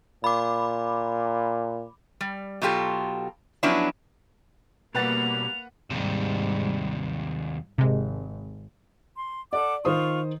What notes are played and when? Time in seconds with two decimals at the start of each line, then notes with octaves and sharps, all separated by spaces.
0.24 A#2 B5 D6
2.21 G3
2.62 B2 F#3 F4 G4 A4
3.63 F3 F#3 B3 C#4 D4 E4
4.95 B2 G3 A#3 B4 F#5 A6 F7
5.90 D#2 G#2 C3 G3
7.78 G#1 C3 G#3
9.17 C6
9.53 A4 D5 F#5 D6
9.85 D#3 F4 C5 C#6 D#6